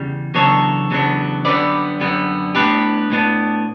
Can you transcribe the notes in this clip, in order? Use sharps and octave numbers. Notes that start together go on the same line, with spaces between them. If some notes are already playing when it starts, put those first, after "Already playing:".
Already playing: E2 C#3 G3
E2 C#3 F#3 B3 D4 A4 C#5
E2 C#3 F#3 B3 D4
F#2 D3 G3 B3 B4 D5
F#2 D3 G3 B3
A2 G3 B3 D4 G4 B4
A2 G3 B3 D4